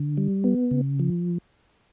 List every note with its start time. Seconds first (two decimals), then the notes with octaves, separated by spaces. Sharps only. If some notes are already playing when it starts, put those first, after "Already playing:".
Already playing: D3
0.17 G3
0.44 B3
0.71 C#3
1.00 F3